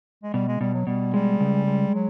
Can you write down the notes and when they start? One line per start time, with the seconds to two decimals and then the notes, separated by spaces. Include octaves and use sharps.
0.23 G#3
0.33 B2 G3
0.48 G#3
0.61 B2 G3
0.74 F#3
0.87 B2 G3
1.14 G3 G#3
1.40 C#3
1.67 G#3
1.95 F#3